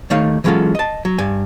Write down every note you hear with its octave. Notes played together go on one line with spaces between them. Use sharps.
D#2 D#3 A3 C#5 F5
E3 F#3 G#3 C#4 F4 A4
D#5 A5
F#3
G2 G#5